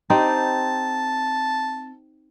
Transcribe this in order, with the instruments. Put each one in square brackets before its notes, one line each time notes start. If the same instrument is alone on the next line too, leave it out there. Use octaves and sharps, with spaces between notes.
[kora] C4 D#4 G4 [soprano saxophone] A5